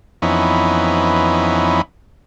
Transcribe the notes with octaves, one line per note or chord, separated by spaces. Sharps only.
F2 E3 B3 C#4 D#4 E4